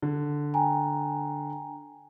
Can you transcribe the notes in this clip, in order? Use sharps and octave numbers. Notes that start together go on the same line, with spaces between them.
D3
G5 G#5 A#5